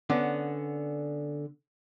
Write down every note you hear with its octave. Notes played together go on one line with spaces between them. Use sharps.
D3 B3 C#4